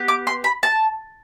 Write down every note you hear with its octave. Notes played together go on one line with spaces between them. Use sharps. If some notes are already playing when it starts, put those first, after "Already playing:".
Already playing: B3 G4
D6
C6
B5
A5